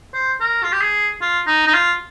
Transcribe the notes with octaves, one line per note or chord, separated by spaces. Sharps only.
C5
A#4
F4
G4
G#4
F4
D#4
D#4
F4